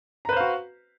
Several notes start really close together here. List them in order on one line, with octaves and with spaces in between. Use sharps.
A#5 B4 C5 F5 F#4